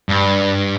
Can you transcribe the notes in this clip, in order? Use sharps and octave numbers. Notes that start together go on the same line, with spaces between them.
G2